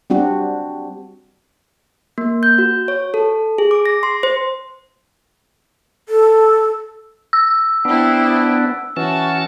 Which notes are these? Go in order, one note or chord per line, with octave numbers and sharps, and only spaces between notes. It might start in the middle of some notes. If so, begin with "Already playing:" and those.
G3 C4 D4 F#4
A#3
G6
F#4
C#5
A4
G#4
D6
A#6
C6
C5
A4
E6
B3 C4 D4 E4
E3 C#4 F#4 A5